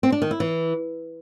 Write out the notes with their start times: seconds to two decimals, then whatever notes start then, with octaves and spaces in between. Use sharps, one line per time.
0.03 C4
0.12 D4
0.22 D#3
0.31 E4
0.40 E3